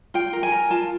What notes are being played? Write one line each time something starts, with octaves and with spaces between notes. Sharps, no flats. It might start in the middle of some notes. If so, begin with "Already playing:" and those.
F4 G5
A#4
G#5
A#4
F4 A5